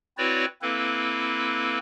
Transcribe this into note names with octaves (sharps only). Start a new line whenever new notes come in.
C4 E4 F#4 B4 C#5 D5
A#3 C4 E4 A4 B4